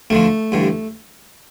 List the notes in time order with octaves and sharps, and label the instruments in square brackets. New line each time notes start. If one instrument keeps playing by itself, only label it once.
[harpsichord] D2 D3 F3 A3
A1 G2 D3